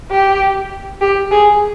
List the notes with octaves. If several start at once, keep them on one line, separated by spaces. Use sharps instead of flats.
G4
G4
G#4